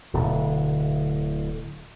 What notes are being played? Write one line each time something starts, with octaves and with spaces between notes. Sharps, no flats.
D1 B2 D3